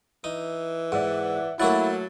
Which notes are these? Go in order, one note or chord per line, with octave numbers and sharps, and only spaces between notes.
E3 D#4
G#2 D5 E5 F#5
F#3 A3 A#3 E4 F#4 F#5 A6